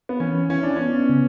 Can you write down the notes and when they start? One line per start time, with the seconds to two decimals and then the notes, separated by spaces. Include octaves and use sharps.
0.09 B3
0.20 E3 C#4
0.49 C#4 E4
0.63 D4
0.76 B3 C#4
1.09 C#3